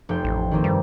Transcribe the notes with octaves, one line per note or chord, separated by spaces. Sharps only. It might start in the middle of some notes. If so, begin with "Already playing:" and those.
F1 G5 C6
A1
D#3 A#3 C4
G2 G3